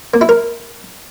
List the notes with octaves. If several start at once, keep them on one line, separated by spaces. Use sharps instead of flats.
A#3
E4
A#4